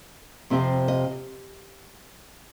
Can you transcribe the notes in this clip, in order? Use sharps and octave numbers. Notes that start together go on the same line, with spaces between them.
F2 C3 F3 C4
D#5